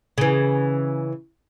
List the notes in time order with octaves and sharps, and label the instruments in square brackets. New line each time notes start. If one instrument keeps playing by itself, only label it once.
[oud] C#3 E3